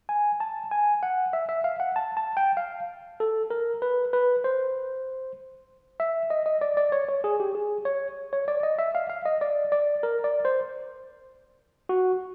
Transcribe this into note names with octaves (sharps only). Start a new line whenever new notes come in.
G#5
A5
G#5
F#5
E5
E5
F5
F#5
A5
A5
G5
F5
A4
A#4
B4
B4
C5
E5
D#5
D#5
D5
D5
C#5
C#5
G#4
G4
G#4
C#5
C#5
D5
D#5
E5
F5
F5
D#5
D5
D5
A#4
D5
C5
F#4